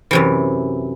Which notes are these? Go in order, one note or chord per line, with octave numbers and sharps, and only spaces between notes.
F#2 C3 E3